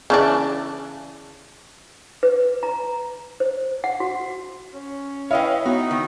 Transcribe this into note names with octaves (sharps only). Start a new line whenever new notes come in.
C#3 E3 D4
B4
A#5
C5
F#5
F#4
C#4
E4 B4 C#5 D#5 F5 G5
B3 D#4 F#4
D#3